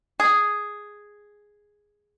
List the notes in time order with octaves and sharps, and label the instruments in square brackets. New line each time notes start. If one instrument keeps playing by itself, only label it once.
[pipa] G#4